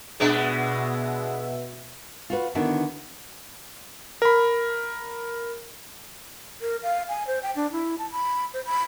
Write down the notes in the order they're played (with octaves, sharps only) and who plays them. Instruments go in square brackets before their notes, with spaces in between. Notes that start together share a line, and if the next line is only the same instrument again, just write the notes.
[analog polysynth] B2 E5 [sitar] G#3 B3 D4
[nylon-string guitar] F4 F#4 B4
D3 D#3 B3 D4 E4 F#4
[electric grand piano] A#4 B5
[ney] A#4
F5
G#5
C5
G5
D4
E4
A5
B5
C5
B5